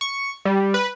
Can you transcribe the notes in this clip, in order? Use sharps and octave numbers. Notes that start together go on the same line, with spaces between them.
C#6
G3
B4